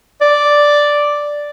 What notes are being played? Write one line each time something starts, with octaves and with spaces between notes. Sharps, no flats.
D5